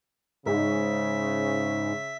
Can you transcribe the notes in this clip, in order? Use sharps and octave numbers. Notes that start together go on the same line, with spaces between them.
G#2 C#3 E5